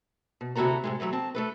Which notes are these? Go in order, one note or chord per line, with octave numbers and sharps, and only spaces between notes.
B2
D2 C3 E4 F#4 A4 A#5
A2 C3 G#3
B2 E3 F#3 A3
C4 A5
A3 A4 B4